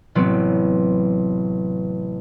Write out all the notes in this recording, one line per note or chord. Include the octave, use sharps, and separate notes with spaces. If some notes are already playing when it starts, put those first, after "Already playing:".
A1 C3 F#3 B3 C4